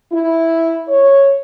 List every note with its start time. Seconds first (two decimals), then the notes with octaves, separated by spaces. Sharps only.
0.13 E4
0.88 C#5